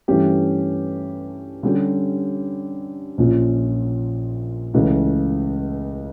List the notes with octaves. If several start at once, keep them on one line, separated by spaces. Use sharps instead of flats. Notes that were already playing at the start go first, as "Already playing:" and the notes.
G2 E3 A3 C#4 G4
D3 G3 C#4 G4
A#1 A#2 F3 C#4
C#2 C#3 E3 A3